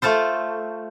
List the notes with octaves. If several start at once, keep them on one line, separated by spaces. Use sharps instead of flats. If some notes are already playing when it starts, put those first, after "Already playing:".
A3 F4 A4 C5